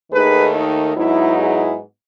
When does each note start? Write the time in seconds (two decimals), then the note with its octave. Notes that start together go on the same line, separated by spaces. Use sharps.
0.11 D#2 D#3 A3 D#4 G#4 B4
0.53 D#4
0.95 G#2 F#3 B3 D#4 E4
1.37 E4 G#4